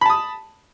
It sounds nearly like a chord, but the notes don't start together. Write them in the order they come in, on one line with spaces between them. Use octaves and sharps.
B5 A5 D#6